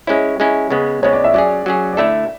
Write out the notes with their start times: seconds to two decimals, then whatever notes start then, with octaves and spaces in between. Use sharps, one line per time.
0.07 G#3 C#4 E4 C#5
0.40 G#3 C#4 E4
0.70 C#3 G#3 B3
1.03 C#3 G#3 B3 C#5
1.13 D5
1.24 E5
1.34 F#3 C#4 G#4 D5
1.66 F#3 C#4 G#4
1.93 D5
1.97 D3 A3 E4 A4 E5